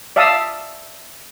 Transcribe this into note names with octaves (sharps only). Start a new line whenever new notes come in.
D5 E5 F5 A5 D#6 E6